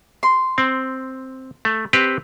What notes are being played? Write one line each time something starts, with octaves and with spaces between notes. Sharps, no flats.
C6
C4
A3
C4 G4 B4